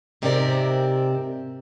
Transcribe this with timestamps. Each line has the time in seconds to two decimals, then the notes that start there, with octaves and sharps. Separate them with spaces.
0.22 G#2 C3 C4 G4 A#4 D5